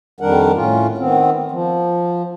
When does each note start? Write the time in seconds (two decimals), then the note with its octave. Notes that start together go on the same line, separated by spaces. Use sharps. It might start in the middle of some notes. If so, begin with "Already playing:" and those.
0.20 F2 D#3 G3 D4 A#4 F#5
0.55 A2 C#4 F4
0.98 D#3 B3 C4
1.51 F3